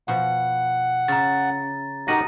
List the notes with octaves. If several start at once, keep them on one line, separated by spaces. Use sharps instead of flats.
B2 F3 F#5
C#3 A#5 A6
D#4 F#4 G4 A#4 D#5 F#5 A#6 D#7